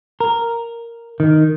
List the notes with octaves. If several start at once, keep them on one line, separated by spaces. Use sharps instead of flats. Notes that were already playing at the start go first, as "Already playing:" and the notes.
A#4
D#3